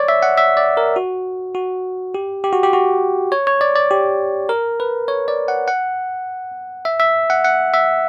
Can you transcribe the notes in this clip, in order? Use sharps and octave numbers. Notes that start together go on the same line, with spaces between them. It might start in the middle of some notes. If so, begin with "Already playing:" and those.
Already playing: C#5 D5
E5
F#5
E5
D5
A#4
F#4
F#4
G4
G4
F#4
G4
F#4
C#5
C#5
D5
D5
G4
A#4
B4
C#5
D5
F#5
F#5
E5
E5
F#5
F#5
E5